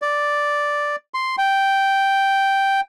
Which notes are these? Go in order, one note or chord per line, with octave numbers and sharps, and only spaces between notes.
D5
C6
G5